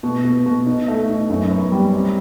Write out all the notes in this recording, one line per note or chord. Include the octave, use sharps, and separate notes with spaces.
B2
B2
B2
D#4
A3
D#4
F#2
B3
G3
C4